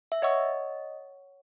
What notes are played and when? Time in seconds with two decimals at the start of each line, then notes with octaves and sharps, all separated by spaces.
0.12 E5
0.22 C#5 D#5 F#5 C#6 E6